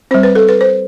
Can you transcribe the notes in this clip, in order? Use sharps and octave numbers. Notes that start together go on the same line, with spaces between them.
G3 C4 C5
B4
A4
B4
C5